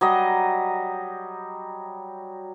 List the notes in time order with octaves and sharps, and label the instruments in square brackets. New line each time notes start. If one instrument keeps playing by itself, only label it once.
[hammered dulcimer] F#3 G3 D#5